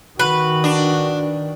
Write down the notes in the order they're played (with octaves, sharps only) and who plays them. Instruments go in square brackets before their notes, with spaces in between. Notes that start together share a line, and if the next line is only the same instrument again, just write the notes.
[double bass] D#3 [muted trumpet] F#4 [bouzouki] B4
[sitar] D4